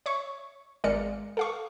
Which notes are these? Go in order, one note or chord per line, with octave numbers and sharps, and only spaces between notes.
C#5 E5 C#6
G#1 G#3 A#4 D5 F5 C#7
A4 F5 C#6